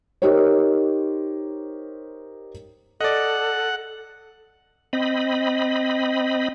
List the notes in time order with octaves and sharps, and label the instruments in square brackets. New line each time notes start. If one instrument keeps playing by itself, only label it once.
[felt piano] D#4 G4 A#4 C5 C#5
[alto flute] A4 [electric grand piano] D5 D#5 [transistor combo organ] F#5
[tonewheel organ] C4 D#5 B5